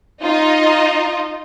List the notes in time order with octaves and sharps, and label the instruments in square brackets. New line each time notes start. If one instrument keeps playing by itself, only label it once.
[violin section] D#4 F4 D#5